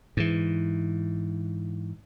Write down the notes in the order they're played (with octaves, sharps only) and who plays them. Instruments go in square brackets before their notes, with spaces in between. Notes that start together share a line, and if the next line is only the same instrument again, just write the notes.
[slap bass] G#2 E3